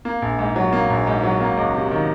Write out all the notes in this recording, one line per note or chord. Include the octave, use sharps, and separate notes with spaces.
A#3
A#1
G#2
F#3
A#3
A#1
G#2
F#3
A#3
C#2
C3
D#3